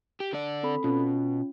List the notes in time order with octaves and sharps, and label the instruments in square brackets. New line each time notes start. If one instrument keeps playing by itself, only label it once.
[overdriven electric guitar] G4
D3 D5
[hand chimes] C4 A4 B5
[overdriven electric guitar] B2 [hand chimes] C#4 F4